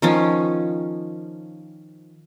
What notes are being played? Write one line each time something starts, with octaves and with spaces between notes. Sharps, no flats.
D#3 F3 C#4